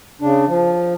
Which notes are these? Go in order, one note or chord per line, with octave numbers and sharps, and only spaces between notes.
C#3 D4
F3